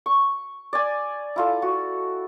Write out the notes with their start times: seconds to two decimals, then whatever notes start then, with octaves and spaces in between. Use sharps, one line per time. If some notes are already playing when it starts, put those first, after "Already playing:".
0.06 C#6
0.73 D5 G#5
1.36 E4 F4 A4
1.62 F#4